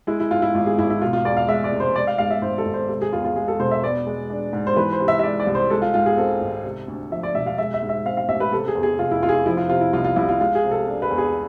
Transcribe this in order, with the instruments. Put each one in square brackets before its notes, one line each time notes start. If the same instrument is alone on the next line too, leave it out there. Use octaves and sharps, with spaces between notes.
[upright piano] G#3 E4
E4
G#2 F4
E4
G#1 F4
G#4
G#1 E4
E4
B2 F4
F4
E2 D5
F5
G#3 E5
D5
F1
C5
G#3 D5
F5
G#2 F5
E5
G#1 C5
A4
G#1
C5
C3 A4
G#4
E2 F4
F4
G#3 G#4
A4
E1 C5
E5
B3 D5
G#3
D4
G#2
C5
E3 B4
C5
C3
E5
E5
G#3 D5
D5
C2
C5
G#3 A4
F4
G#2 F4
G#4
C4 A4
G#1
C3
D2
F3 E5
D5
E1 E5
F5
G#3 E5
E5
G#2
E5
C4 F5
F5
A1 E5
B4
C3 A4
G#4
E2
G#4
F1 F4
E4
F1 F4
G#4
F4
F3 E4
F4
C3 F4
E4
C2 F4
F4
C2 E4
F4
G#3 F4
G#4
C3
A4
D4
B4
E2
G#4